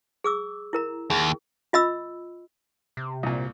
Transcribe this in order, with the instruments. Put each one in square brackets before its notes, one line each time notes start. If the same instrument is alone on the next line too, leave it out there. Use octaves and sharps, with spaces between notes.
[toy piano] G#4 D6 E6
E4 A#4 A#5
[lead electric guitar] D#2 [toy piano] G#4
[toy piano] F4 D#5 B5 E6
[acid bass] C3
[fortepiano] C2 A#2